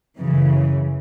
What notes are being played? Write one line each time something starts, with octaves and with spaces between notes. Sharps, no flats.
F#2 C#3 E3